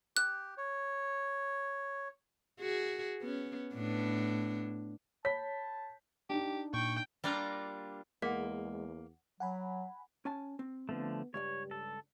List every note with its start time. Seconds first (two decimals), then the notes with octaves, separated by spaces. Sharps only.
0.17 G4 F#6
0.57 C#5
2.60 F#4 G#4
3.22 B3 C#4
3.74 A2 B3 D4
5.25 C#5 A5 B5 G6 B6
6.30 D4 D#4 G4
6.74 A#2 G5 C#6
7.24 G3 A#3 D4 F4 A#5
8.22 E2 G#3 A#3 F#5 B6
9.40 F#3 F#5 G#5 B5
10.25 C#4 G#5 A5
10.59 C4
10.89 D3 F3 A3 B3
11.34 C#2 G2 G4 C#5 D5
11.71 A4